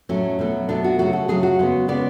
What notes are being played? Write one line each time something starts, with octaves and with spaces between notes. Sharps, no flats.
A2 F#3 A3 C#4
B2 F#3 A3
B2 F#3 A3 D4
F#4
C#3 F#3 A3 F#4
A4
C#3 F#3 A3 G#4
F#4
C#3 G#3 B3
C#3 G#3 B3 D5